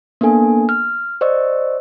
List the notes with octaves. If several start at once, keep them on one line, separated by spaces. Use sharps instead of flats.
A#3 B3 D4 A4 G#5
F6
C5 D5 D#5 C#6 E6